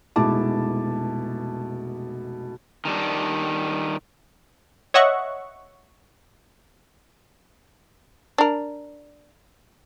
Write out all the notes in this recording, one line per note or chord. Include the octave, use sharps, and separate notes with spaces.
F1 B2 G#3 E4 A5 D6
D#3 G3 D4
C#5 D#5 E5 F#5 C#6
D4 A#4